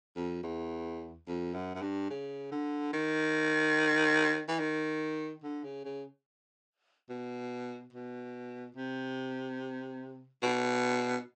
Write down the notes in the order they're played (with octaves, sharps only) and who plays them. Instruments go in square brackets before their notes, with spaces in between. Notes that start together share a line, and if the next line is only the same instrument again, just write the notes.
[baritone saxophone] F2
E2
F2
F#2
F#2
G2
C#3
D3
D#3
E3
D#3
D3
C#3
C#3
B2
B2
C3
B2